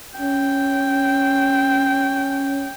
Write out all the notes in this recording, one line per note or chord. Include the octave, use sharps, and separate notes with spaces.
C#4 G5